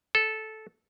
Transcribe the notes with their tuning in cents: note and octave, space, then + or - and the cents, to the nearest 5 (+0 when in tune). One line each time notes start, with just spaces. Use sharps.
A4 -10